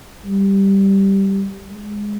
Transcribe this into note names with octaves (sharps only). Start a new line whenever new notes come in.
G3
G#3